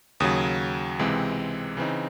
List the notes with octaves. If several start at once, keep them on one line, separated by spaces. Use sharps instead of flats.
D#2 C#3 F#3 D#6
C#2 C3 E3 G#3 C4
C#3 E3 C4 D#4